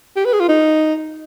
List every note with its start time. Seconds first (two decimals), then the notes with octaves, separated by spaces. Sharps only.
0.16 G4
0.25 B4
0.33 G#4
0.40 F4
0.48 D#4